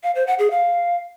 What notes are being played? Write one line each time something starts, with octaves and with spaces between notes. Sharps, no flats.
F5
C5
F#5
G#4
F5